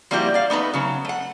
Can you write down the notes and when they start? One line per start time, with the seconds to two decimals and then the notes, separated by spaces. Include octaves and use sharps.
0.11 F3 G3 A#3 E4 F#4 G4
0.34 D5 F5
0.50 A3 B3 D#4 B4
0.74 C#3 F#3
1.05 A3 F#5